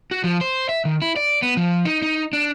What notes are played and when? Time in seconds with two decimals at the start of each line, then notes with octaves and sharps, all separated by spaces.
0.11 F#4
0.24 F3
0.41 C5
0.69 E5
0.85 D#3
1.02 E4
1.16 D5
1.42 B3
1.57 F3
1.85 D#4
2.02 D#4
2.33 D4